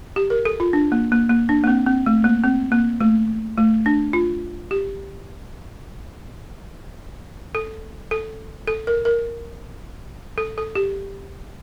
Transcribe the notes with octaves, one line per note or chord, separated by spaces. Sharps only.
G4
A#4
A4
F4
D4
A#3
A#3
A#3
D4
A#3
C4
C4
A3
A#3
C4
A#3
A3
A3
D4
F4
G4
A4
A4
A4
A#4
A#4
A4
A4
G4